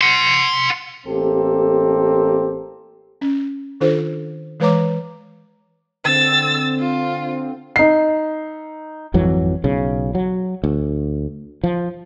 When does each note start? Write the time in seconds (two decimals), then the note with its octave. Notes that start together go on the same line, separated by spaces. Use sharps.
0.01 F#5 C6
1.06 A1 A#3 C4 G4 A4
3.21 C#4
3.81 D#3 D4 F4 A4 C5
4.60 E3 G#3 B4 C#5 A#5 D6
6.05 D3 C4 E6 A6
6.80 F4
7.76 D#4 C7
9.14 G#1 F2 E3 F#3
9.64 B1 C#3
10.15 F#3
10.64 D2
11.64 F3